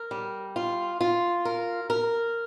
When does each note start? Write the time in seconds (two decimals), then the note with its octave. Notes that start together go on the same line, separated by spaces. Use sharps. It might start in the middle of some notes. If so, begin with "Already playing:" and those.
Already playing: A#4
0.11 G3
0.56 F4
1.01 F4
1.45 A#4
1.90 A#4